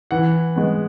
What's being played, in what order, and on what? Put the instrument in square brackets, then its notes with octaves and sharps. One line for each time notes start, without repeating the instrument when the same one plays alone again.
[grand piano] E3 F#5
G#3 B3